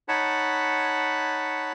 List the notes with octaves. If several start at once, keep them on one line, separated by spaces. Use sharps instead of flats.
D#4 C#5 F#5 A5 B5